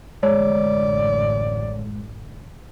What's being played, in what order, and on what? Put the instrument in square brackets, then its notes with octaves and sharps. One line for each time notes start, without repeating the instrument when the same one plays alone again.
[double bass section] A1 F#2 D3 [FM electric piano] G#3 [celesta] C#5 [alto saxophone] D5